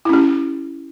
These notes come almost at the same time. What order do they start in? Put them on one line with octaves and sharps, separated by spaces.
E4 C#4 G4